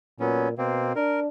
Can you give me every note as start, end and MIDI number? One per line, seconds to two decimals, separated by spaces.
0.20 0.57 46
0.20 0.48 54
0.20 0.48 59
0.20 0.48 61
0.58 0.94 47
0.58 0.93 58
0.58 0.93 60
0.96 1.28 62
0.96 1.20 70